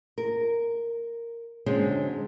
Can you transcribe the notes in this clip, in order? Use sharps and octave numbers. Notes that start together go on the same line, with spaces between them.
A#4
D3 F#3 G#3 C4 C#4